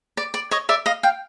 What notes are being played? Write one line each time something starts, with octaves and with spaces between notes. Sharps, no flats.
D5
D5
C#5 D#5
D5 E5
D#5 F5
F5 G5